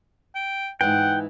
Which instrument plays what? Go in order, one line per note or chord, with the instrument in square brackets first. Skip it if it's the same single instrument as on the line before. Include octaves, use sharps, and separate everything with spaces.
[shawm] G5
[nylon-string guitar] G#2 E3 [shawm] F#5 [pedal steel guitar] G5